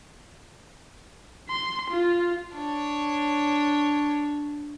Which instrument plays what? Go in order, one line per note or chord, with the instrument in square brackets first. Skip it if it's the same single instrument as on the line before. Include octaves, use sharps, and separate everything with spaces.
[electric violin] C6
F4
[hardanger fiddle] D4 C#5